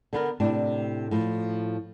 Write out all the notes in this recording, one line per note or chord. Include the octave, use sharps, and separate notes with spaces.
D3 B3 A#4
A2 C3 D4
A2 F3